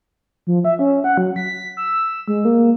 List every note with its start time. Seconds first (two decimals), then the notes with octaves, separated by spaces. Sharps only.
0.47 F3
0.65 E5
0.79 C#4
1.04 F#5
1.17 F#3
1.36 B6
1.77 E6
2.28 G#3
2.45 A#3